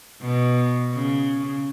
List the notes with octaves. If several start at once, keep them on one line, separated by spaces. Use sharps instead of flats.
B2
C#3